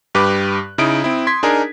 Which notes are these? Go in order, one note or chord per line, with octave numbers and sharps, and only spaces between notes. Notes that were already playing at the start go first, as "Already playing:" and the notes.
G2 G4 B4 D6 F#6
C#3 D#4 E4 D#6 D7
C4 E4
C6 G#6 B6
D4 D#4 G#4 A#4